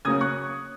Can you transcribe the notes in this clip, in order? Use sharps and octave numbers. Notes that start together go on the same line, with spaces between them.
C#3 F#3 A#3 C#4 D#6 G#6
C#6 F#6